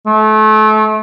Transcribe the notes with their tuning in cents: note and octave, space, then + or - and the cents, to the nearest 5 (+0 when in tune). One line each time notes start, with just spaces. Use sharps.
A3 -30